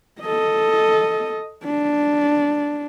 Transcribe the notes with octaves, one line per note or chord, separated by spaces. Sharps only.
A4 D#5
D4